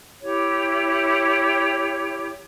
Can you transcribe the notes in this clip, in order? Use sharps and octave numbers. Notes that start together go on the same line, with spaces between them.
E4 G4 C#5